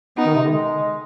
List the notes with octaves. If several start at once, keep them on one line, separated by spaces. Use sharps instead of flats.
B3 D#4
D#3
C3
D3
G#3